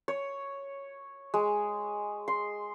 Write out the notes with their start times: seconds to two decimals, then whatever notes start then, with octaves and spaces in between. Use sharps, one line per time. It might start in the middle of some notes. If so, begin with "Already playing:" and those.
0.08 C#5
1.34 G#3
2.28 C6